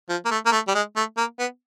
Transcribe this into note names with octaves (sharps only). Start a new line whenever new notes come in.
F3
A#3
A3
A#3
A3
G3
G#3
A3
A#3
B3